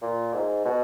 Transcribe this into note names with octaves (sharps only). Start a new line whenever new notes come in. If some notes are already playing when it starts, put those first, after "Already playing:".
A#2
G#2
B2